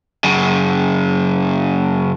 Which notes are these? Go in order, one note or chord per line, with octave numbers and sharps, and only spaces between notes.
F#2 C#3